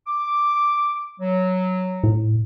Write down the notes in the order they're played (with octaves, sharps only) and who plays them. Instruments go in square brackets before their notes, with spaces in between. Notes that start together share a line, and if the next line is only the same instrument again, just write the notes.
[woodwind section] D6
F#3
[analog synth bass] A2